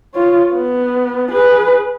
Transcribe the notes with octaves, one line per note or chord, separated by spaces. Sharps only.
F4 C#5
B3
G#4 B4